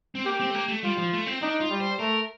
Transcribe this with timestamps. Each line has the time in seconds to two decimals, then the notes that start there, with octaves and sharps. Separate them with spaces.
0.15 C4
0.25 A#3 G4
0.40 C4
0.50 A3
0.54 A#3
0.68 A3
0.83 G3 F4
0.98 F3
1.13 A3
1.26 C4
1.42 D4 D#4
1.60 F4
1.70 G3
1.80 C5
1.99 A3 A#4